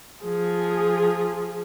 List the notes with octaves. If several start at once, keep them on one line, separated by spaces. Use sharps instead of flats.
F3 G#4